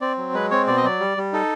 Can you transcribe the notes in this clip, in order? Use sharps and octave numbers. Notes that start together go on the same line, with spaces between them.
C4 D5
F#3
G#3 B4
C4 C#5
B2 D5
D#5
F#3 D5
G3
G3
D#4 A4